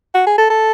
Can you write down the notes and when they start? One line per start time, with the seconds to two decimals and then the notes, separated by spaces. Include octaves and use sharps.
0.14 F#4
0.26 G#4
0.38 A4
0.50 A4